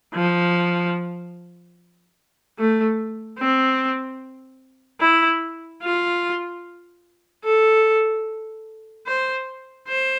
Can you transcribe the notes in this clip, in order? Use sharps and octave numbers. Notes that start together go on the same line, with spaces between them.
F3
A3
C4
E4
F4
A4
C5
C5